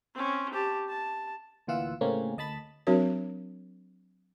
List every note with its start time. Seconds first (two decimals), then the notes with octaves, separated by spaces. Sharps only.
0.15 C4 C#4
0.53 G4 A5
0.89 A5
1.67 D2 A#2 E3 F4 F#5 E6
2.01 A2 C#3 A#3 C4 C#4
2.37 D2 D#5 A5 B5 A6
2.87 F#3 C4 D4 F#4 A#4 C#5